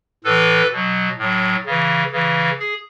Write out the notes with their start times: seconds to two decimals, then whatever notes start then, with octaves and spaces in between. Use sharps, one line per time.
0.24 A2 E3 A4 B4
0.72 B2 F#3
1.18 A2 F#3
1.66 C#3 E3
2.12 C#3 E3
2.59 G#4